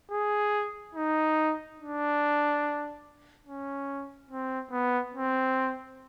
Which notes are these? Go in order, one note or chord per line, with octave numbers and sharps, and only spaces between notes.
G#4
D#4
D4
C#4
C4
B3
C4